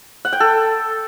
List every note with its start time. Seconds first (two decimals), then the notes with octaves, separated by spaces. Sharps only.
0.25 F#5
0.33 G5
0.40 A4